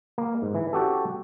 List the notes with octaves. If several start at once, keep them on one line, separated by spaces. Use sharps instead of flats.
A#3
G#2
E3
C#4 F#4 G4 A4